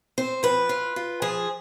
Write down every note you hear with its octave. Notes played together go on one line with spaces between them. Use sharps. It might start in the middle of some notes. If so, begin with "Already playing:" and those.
C4 C5
F3 B4
F4
F4
F3 G#4